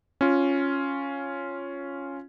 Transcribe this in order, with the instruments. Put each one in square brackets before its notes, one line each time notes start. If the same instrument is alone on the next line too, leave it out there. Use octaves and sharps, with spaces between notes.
[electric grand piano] C#4 F4